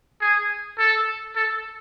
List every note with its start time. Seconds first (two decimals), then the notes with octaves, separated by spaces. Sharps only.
0.21 G#4
0.79 A4
1.36 A4